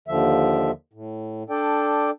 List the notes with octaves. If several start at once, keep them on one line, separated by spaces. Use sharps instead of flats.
D#2 D3 F3 E5
A2
D4 A4 D5 G5